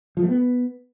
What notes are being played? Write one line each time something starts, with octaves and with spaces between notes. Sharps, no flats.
F3
A3
B3